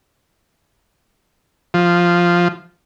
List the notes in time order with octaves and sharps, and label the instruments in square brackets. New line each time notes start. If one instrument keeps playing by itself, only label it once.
[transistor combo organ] F3